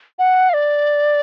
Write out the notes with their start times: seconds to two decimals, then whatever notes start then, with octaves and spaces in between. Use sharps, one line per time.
0.19 F#5
0.49 F5
0.54 D5